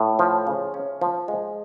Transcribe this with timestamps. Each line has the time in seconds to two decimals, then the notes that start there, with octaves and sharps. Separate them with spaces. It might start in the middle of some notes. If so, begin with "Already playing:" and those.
Already playing: A2
0.19 F3
0.47 C#3
0.74 C#4
1.01 F3
1.28 G#3